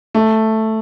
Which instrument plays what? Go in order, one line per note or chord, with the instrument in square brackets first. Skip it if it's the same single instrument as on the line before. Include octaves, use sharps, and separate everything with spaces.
[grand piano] A3